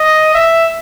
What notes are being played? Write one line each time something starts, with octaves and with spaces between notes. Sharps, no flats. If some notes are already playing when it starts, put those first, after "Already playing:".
Already playing: D#5
E5